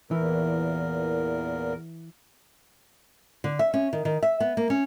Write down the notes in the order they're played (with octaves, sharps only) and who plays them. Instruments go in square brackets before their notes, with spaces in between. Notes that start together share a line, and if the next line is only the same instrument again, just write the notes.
[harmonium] E2 A#2 A#4 [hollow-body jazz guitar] E3
[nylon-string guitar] D3
E5
C#4
D#3
D#3
E5
B3
A#3
C#4